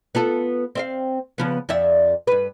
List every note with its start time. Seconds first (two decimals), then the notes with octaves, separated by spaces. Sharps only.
0.15 B3 F4 A4
0.75 C4 E5 F5
1.38 C#3 F3 B3
1.69 F2 D5 E5
2.27 G2 B4